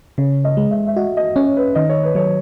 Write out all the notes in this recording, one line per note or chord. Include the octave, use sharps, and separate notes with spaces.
C#3 C#5
D#5
G#3
E5
E5
F#4 D#5
D#5
C#4 C#5
B4
D#3 D#5
C#5
B4
F#3 C#5